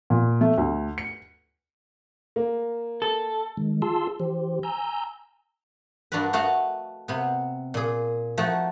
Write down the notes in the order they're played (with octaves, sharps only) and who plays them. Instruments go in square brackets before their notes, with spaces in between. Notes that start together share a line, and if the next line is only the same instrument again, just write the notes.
[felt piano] A#2
A3
D2
C#7
[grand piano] A#3
[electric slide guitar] A4
[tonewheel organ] D#3 G#3
F4 G#4 A5 C6 E6
E3 G4 C5
G#5 A#5 E6 G6
[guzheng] G2 D4 F#4 A#4 B4
A3 F#4 D#5 F5 F#5
C3 B3
A#2 G#4
F3 A3 D#4 F#4